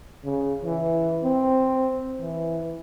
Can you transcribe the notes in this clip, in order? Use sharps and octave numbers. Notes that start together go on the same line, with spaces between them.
C#3
E3
C4
E3